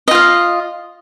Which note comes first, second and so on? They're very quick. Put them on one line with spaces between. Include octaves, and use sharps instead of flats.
D#5 F4 F5